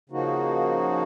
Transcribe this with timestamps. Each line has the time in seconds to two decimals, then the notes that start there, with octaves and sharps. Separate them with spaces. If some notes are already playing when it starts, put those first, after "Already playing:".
0.10 C#3 F3 A#3 D#4 F#4